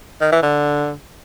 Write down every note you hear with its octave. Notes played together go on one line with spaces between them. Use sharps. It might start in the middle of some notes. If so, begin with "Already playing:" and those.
D#3
E3
D3